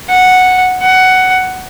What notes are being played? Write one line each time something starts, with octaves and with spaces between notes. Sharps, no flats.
F#5
F#5